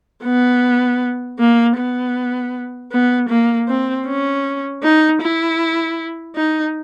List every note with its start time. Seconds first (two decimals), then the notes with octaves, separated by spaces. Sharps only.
0.24 B3
1.39 A#3
1.77 B3
2.91 B3
3.29 A#3
3.68 C4
4.07 C#4
4.83 D#4
5.21 E4
6.35 D#4